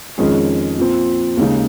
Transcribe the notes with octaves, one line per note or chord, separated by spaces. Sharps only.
F2 D#3 G#3 C#4 G#4
A#2 F3 C4
D#2 C#3 G#3 D#4